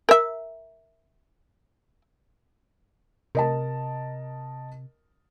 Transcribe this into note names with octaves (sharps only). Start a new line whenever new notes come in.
A#4 E5
C3 A#4 D#5 A5